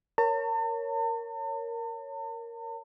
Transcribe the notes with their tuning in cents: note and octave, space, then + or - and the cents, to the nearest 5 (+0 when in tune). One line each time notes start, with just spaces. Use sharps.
A#4 +0 C#5 +0 A5 +45